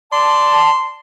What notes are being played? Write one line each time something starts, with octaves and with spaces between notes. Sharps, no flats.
D5 A5 C6